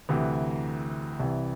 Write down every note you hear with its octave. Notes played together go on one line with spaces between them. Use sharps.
D2 C3 E3
C2 C3 E3